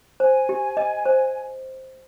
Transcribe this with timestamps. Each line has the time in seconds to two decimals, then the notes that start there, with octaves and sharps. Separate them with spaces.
0.20 C5 G#5
0.49 G4
0.77 D#5
1.05 C5